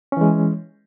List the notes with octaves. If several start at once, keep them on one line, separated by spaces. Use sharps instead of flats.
E3 G#3 C#4